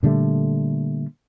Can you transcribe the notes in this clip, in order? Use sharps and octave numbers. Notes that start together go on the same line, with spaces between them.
A#2 D3 G3 A3